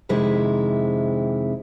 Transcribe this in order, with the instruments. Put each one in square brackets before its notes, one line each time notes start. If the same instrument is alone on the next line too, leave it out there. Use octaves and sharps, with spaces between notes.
[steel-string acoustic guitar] F2 C3 D#3 G#3 E4